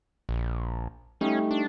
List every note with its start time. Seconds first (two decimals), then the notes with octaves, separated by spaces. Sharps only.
0.29 A#1
1.21 G3 A3 C#4 D#4
1.51 D4